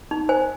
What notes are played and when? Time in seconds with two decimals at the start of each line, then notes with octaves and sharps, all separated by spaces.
0.11 D#4
0.29 C5 G#5